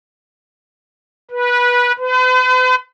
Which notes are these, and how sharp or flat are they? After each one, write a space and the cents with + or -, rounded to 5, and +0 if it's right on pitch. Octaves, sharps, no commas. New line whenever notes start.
B4 -20
B4 +45